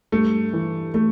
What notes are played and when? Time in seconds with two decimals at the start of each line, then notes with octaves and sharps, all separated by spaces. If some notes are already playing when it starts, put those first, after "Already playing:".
0.12 G2 A3
0.53 E3
0.94 A3